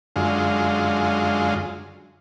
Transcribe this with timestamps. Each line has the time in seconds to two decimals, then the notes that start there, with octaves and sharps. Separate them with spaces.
0.16 F#2 D3 G#3 F4